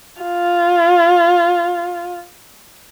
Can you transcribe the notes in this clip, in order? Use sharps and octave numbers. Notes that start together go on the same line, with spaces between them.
F4